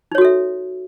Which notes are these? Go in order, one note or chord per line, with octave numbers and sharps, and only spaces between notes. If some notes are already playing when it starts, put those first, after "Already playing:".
D#4 F#4 A4 C#5 E5